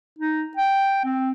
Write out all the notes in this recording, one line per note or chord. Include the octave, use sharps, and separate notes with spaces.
D#4
G5
C4